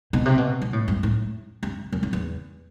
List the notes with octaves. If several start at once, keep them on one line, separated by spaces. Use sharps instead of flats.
B2
C3
B2
B2
A2
G2
A2
G2
F#2
E2
E2